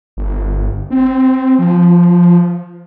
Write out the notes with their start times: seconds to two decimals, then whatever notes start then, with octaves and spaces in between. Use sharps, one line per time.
0.17 G1
0.90 C4
1.58 F3